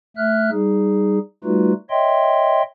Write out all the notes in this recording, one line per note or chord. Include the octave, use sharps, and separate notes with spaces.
A3 E5 F6 F#6
G3 D#4 G#4
G3 A3 D#4 F4 F#4 B4
C#5 D#5 E5 G5 C6